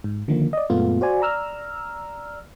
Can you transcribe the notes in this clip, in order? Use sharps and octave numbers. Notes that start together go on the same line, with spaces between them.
G#2
D3 D#3 F3 A#3
D5 D#5
F#2 A#2 G#3 A3 B3 F4
F#4 C5 D5 G#5
D5 A#5 E6 F6